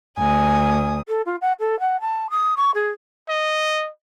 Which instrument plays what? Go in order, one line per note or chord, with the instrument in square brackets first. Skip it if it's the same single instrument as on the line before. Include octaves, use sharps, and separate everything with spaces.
[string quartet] D2 D#6 [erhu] G#5
[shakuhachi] A4
F4
F#5
A4
F#5
A5
D#6
C#6
G#4
[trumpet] D#5